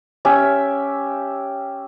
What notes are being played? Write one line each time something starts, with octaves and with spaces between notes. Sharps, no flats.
C#4 G4 E5